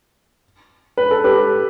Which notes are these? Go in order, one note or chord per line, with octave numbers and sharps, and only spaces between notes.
B4
A4
G4 B4